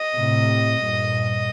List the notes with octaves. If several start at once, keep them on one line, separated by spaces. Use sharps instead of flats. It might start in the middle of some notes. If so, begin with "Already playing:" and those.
Already playing: D#5
A2 C3
G2 A#2